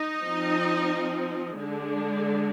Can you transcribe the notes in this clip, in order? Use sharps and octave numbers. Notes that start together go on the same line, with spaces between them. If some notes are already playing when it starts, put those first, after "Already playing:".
Already playing: D#4 D#5
F3 C4
D3 G#3 D4